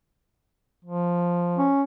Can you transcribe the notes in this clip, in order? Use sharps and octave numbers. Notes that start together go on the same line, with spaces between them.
F3
C#4